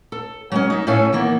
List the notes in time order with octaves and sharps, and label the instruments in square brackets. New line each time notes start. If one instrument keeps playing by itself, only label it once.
[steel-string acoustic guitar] A4
F#3 G#3 C#4
D#4 E5
A2 A3 C#4 A4 F5 G#5
D#3 E3 A#3 B3